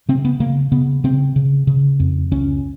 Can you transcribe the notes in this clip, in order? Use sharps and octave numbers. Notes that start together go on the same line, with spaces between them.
C#3 C4
B3
C#3 A#3
C#3 B3
C#3 C4
C#3
C#3
F2
C#2 C#4